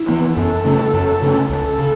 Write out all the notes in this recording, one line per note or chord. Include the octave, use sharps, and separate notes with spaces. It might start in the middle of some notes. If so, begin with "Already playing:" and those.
Already playing: E4
E3 B3
F#2 A4
C#3 A3 C#4
F#2
C#3 A3 C#4
C#2 A4
C#3